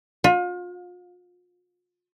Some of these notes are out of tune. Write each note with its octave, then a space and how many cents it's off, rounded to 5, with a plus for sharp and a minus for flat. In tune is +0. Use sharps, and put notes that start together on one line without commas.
F4 +35